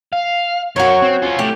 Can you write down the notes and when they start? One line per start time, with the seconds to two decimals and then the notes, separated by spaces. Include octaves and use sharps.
0.13 F5
0.76 F#2 F#4 A#4 C#5
1.02 C4
1.22 C#4 F4
1.39 A2 G4